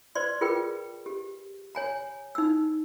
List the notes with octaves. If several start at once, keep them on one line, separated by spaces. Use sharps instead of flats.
B4 C5 D5 C6
F4 G#4 A#4 B4 G5
G4
C#5 G#5 A#5
D#4 E6